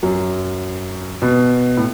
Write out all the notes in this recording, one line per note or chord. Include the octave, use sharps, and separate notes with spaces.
F#2 F#3
B2
A2